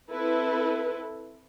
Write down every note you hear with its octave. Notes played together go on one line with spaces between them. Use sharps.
C4 E4 A4 B4